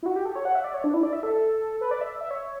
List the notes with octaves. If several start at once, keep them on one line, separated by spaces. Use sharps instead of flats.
E4
F#4
G4
A4
C#5
F#5
E5
D5
C#5
D4
E4
D5
E5
A4
B4
D5
E5
E5
C#5